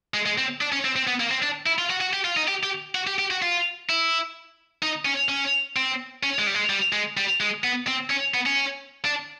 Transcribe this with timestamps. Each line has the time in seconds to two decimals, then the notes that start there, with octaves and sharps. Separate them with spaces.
0.14 G#3
0.26 G#3
0.38 C4
0.61 D4
0.72 C#4
0.85 C4
0.96 C4
1.07 B3
1.20 A#3
1.31 C4
1.43 D4
1.66 E4
1.79 F4
1.90 F#4
2.01 F#4
2.13 G4
2.25 F4
2.37 D#4
2.48 G4
2.63 G4
2.95 F#4
3.07 G4
3.19 G4
3.31 F#4
3.42 F4
3.89 E4
4.82 D#4
5.05 C#4
5.29 C#4
5.76 C4
6.23 C#4
6.39 G#3
6.47 G3
6.55 G#3
6.70 G3
6.93 G#3
7.17 G3
7.41 G#3
7.64 B3
7.87 C4
8.10 C#4
8.34 B3
8.46 C#4
9.05 D4